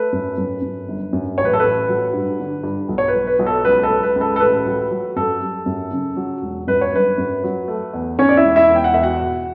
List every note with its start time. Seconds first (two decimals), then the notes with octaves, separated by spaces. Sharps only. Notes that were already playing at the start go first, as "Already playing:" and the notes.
Already playing: A3 B4
0.13 F#2
0.38 F#2
0.62 F#2
0.88 G1
1.13 F#2
1.38 A1 C#5
1.45 B4
1.53 A4
1.60 A1 B4
1.89 F#3
2.13 G2
2.39 D3
2.63 G2
2.89 B1
2.98 C#5
3.08 B4
3.15 B1
3.27 B4
3.39 B1
3.47 A4
3.65 C#2 B4
3.83 A4
3.90 C#2
4.03 B4
4.16 C#2
4.21 A4
4.36 A4
4.40 A1 B4
4.66 F#3
4.91 F#3
5.16 F#2 A4
5.41 G3
5.66 F#2
5.92 C#3
6.17 F#3
6.42 E1
6.67 F#2 B4
6.81 C#5
6.93 G1 B4
7.18 F#2
7.44 F#3
7.68 A3
7.93 E2
8.18 E2 C#4 C#5
8.29 D5
8.37 E4 E5
8.44 E1
8.56 E4 E5
8.69 E2
8.76 G5
8.84 F#5
8.94 E2 E5
9.03 F#4 F#5
9.20 B2